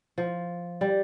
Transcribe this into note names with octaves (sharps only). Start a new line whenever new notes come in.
F3
G3